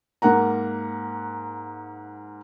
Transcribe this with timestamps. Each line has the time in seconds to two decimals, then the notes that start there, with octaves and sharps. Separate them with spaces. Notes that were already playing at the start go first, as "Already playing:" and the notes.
0.22 G#2 A#3 F#5 A#5